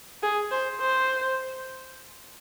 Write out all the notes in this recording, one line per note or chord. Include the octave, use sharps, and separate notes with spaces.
G#4
C5
C5